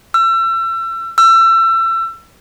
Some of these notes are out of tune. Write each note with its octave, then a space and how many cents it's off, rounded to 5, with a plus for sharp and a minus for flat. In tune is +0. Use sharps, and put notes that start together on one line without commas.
E6 +35
E6 +30